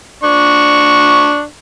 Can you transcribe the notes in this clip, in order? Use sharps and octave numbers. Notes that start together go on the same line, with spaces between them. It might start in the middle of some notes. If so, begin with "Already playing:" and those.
D4 C#6